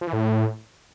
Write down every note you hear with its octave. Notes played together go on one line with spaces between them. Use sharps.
F3
E3
A2